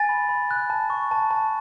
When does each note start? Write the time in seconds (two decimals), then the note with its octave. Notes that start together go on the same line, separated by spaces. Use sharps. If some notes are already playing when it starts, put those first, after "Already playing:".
Already playing: G#5 A6
0.09 B5
0.29 B5
0.51 F#6
0.70 A5
0.90 C#6
1.11 A5
1.31 A5